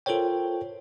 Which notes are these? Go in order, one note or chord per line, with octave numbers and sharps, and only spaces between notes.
F4 A4 A#4 C5 C#5 G5